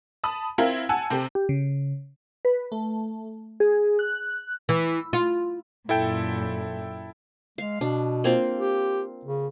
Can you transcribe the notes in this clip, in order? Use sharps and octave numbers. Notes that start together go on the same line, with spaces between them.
A5 B5 D#6
C4 E4 F4 A#4
F#5 G#5 A5 E6
C3 C4 G4 A4
G4
C#3
B4
A3
G#4
F#6
E3
F4
F#2 A#2 E4 A4 G5
G#3 F5
B2 D4
A#3 C4 F4
G4
C#3